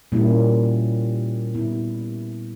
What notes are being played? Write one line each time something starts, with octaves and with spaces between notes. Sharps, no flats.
A#2 G3 A#3 C#4 E4
A#2 G3 B3 E4